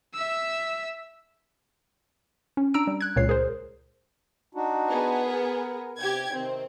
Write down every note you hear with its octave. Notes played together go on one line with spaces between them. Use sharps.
E5 E6
C#4
D4 A#5 E6 D7
G3
F#6 G#6
C#2 A#2 C#5 C7
G#4 A#4 C5
D4 D#4 F#4
B3 G#4
A#4
C3 G4 G5 G#6
C3 D#3 C4